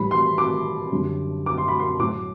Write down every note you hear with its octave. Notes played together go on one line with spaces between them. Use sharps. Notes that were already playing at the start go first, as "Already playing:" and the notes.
Already playing: A2 E3 G3 B5
C6
D6
F#2 D3 G3
D6
C6
B5
C6
A2 F#3 D6